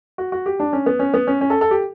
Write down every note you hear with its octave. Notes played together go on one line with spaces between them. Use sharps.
F#4
F#4
G4
D4
C#4
B3
C#4
B3
C#4
C#4
A4
A4
G4